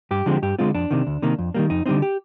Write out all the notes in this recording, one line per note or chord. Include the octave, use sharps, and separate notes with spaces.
G2 G4
D3 F3 G#3 C4
G2 G4
D3 G#3 C4 F4
F2 D4
C3 D#3
D2
C3 D#3 A#3
F2
D#3 G3 A#3
F2 D#4
D3 G3 C4 D#4
G4